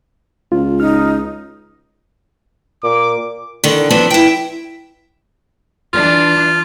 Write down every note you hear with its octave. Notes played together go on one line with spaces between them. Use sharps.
C#2 F4
D#4 F6
A#2 D6
D3 D#3
F3 B3 C4 D4
E4 G5
E3 D4 F4